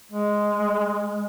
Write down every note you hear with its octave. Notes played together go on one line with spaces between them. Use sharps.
G#3